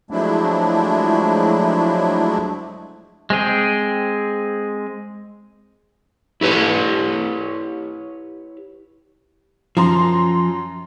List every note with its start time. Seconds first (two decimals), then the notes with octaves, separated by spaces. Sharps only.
0.11 F3 F#3 G#3 A3 D4 E4
3.30 G#3 C4 G#4 G5
6.41 E4 G4 B4 C#5
9.77 F#2 F3 A#5 C6